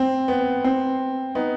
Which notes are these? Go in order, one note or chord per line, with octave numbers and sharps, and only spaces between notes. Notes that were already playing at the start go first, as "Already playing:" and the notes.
Already playing: C4
B3
C4
B3 D#4